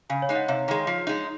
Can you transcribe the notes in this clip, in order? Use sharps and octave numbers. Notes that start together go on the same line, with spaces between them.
C#3 F5 G#5
C#5 F5
G#3 D#4
D#5 F#5
C3 C#5 F5
D#3 G#3
F3
G#3 D#4